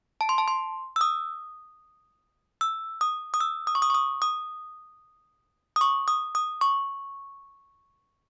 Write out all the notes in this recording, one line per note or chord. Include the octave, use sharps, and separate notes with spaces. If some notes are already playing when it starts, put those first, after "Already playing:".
A5
C6
A5
C6
E6
D#6
E6
D#6
D#6
E6
D#6
C#6
D#6
C#6
D#6
D#6
D#6
C#6
D#6
D#6
C#6